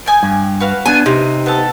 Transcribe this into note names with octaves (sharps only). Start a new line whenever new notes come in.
G5 G#5 D#6
G2
F#4 B4 F5
B3 D4 G#5
C3 D#4
B3 C4 A4